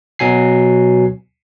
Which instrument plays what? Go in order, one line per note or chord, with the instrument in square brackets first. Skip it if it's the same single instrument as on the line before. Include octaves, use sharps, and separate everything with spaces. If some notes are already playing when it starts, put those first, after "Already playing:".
[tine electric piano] B2 F#3 G#5 C7